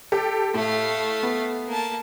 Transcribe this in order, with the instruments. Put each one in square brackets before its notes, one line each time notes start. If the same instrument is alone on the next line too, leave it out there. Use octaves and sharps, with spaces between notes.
[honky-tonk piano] G4 A4
[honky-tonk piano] A2 [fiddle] A3 F5
[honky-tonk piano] B3
[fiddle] A#3 A5